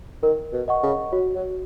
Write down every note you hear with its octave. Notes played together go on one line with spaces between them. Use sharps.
D#3 A#4
B2
D#5 F#5 C#6
C#3
F#3 F#4
F#3